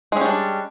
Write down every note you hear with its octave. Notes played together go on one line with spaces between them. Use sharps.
G3 G#3 C#4 D4